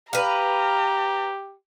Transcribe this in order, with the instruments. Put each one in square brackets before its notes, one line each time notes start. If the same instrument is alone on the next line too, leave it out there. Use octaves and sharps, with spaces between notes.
[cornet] G4 [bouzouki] B4 F5 [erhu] A#5